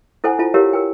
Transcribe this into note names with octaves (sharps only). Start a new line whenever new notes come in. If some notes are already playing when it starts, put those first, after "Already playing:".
E4 A4 C5 F#5 G#5
E4 F4 A5
E4 G4 A#4 C#5 F5
G4 A#4 G5